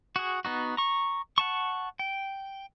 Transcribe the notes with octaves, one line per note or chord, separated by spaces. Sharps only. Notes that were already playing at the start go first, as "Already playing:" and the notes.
F#4 G#4
B3 D#4 F#4
A#5 C#6
F#5 A5 C#6
G5